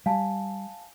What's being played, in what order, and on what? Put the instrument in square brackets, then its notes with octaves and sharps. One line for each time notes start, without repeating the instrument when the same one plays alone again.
[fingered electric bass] G3 [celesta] F5 G#5 A5